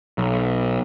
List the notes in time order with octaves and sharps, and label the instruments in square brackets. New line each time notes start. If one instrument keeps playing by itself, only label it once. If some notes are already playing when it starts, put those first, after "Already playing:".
[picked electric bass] B1